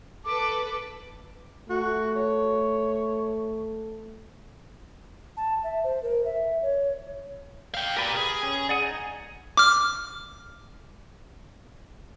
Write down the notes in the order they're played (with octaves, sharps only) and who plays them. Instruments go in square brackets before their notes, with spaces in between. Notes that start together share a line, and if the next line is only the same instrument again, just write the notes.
[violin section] A4 B4 [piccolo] D6
[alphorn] A3 [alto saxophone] F#4
[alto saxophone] C#5
[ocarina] A5
E5
C5
A#4
E5
C#5
[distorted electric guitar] F5 G5
[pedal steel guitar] G4 B4 [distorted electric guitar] A#4 D5
[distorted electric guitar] G#4
[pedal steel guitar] C#4
D5 F#5 D#6
D#4 G#5
[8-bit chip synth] D6 F6